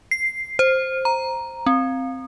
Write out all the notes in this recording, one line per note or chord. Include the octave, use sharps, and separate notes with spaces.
C7
C5
A#5
C4